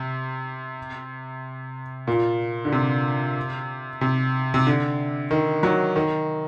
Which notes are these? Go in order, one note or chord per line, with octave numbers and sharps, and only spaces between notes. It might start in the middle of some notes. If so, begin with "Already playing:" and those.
Already playing: C3
A#2
D3
C3
C3
C3
D3
D#3
F#3
D#3